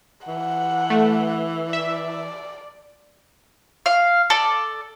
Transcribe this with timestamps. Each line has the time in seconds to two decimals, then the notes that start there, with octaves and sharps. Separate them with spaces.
0.27 E3 F#5
0.90 A3
1.73 D5 E5
3.86 F5
4.30 A4 D5